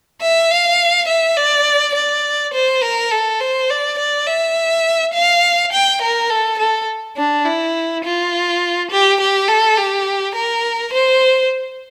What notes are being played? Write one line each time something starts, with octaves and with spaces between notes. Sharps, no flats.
E5
F5
E5
D5
D5
C5
A#4
A4
C5
D5
D5
E5
F5
G5
A#4
A4
A4
D4
E4
F4
G4
G4
A4
G4
A#4
C5